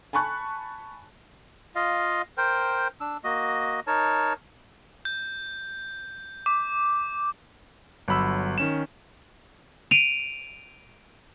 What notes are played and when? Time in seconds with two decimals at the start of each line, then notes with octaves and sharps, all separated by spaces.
0.13 G#5 A5 B5 C#6 F#6
1.75 F4 D#5 F5
2.38 A#4 C5 G5
3.01 D4 E6
3.24 A#3 F#4 D#5
3.87 D#4 A#4 C#5 A5
5.05 G6
6.46 D6
8.08 G1 F#3 B5 E6
8.58 D#3 C#4 E7
9.91 D7 D#7 F7